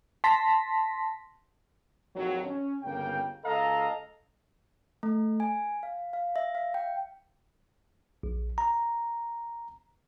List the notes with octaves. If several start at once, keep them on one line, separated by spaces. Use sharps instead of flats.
A5 C6 A#6 B6
A#1 F2 D#3 F#3
C#4
G1 C#3 A#3 G5
C#2 A4 D#5 F5 A#5
A3
G#5
F5
F5
E5
F5
G5
A#1
A#5